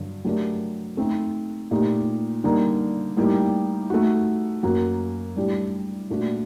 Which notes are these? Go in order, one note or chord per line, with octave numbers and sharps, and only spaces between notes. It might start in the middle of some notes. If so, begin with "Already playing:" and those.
Already playing: G2 D3 F#3
F#3 A3 D4 G4 A#4
A3 C4 D#4
A#2 A3 D#4 G4
D3 G3 A#3 D#4
A2 G3 A#3 D#4 G4
A3 D#4 F#4
F#2 F#3 A#3 F#4
A2 G3 D4 G4
A#2 A3 D4 F#4